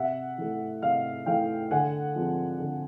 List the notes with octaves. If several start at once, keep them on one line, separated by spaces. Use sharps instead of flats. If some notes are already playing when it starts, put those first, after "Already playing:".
Already playing: C3 E5 F#5
E3 A3
C3 D#5 F5
E3 A3 F5 G5
D3 F#5 G#5
F3 G#3 C4
D3